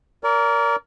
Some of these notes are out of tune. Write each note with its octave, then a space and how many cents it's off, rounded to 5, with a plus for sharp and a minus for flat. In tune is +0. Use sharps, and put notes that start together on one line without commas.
A#4 +0 D5 -35